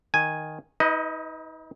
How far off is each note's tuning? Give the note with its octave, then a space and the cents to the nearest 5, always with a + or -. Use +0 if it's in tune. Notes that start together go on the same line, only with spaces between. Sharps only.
D#3 +0 G#5 +0
D#4 +40 B4 +5 D#5 +0